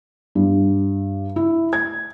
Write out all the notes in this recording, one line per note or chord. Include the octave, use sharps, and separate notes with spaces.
G2
E4
G#6